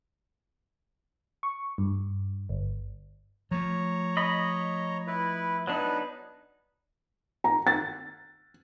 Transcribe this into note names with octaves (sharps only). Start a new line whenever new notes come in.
C#6
G2
G1
F3 A3 C#5 A#5
D#5 B5
E4 B4
F#3 B3 D4 D#4 B4
A#5
A6